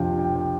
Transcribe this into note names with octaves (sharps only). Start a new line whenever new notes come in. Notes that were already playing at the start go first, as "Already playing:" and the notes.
Already playing: F2 C3 F3 D4 F5 G5
G5
G5